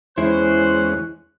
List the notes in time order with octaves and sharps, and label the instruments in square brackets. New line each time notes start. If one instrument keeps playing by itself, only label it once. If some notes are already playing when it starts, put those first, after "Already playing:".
[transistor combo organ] E2 G#3 C#4 [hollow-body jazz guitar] E4 [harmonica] C5 [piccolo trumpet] F#6